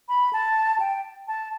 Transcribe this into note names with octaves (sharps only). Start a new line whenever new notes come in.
B5
A5
G5
A5